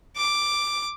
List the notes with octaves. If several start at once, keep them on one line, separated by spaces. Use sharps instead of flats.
D6